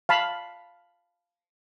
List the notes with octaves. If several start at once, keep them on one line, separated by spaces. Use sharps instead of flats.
F5 A5 B5